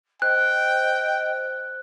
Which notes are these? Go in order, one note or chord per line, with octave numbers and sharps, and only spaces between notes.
C5 D#5 G5 F#6